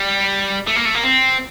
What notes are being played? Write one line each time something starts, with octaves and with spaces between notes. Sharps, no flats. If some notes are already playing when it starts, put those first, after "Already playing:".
Already playing: G3
A3
A#3
A3
A#3
C4